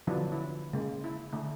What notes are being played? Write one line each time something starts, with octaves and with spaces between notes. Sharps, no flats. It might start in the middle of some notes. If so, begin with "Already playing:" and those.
D3 F3 F#3 B3 D4 E4
E4
C#3 G#3 A#3
E4
D3 A3